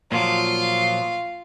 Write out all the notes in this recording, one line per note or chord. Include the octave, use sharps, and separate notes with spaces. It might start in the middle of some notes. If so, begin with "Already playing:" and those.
A#2 F3 F#3 F4 F5